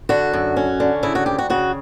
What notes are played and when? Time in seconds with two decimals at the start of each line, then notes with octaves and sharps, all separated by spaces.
0.09 D3 F#4
0.33 F#2
0.56 C#4
0.80 D3
1.03 C#3 E4
1.15 F#4
1.26 D2 G4
1.38 F#4
1.50 C#3 F#4